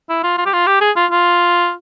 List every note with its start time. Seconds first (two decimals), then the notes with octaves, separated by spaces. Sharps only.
0.09 E4
0.23 F4
0.37 F4
0.46 G4
0.53 F4
0.66 G4
0.81 G#4
0.96 F4
1.11 F4